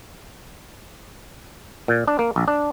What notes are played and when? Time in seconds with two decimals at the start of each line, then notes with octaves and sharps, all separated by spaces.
1.88 A#2
2.08 D4
2.19 A#3
2.36 A#1
2.48 D4